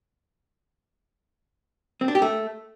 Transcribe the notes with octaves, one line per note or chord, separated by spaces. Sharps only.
C4
D4
G4
A3